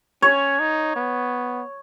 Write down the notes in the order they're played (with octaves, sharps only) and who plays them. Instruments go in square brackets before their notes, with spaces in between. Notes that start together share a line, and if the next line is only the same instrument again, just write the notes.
[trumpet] C#4 [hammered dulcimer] C#5
[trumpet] D#4
B3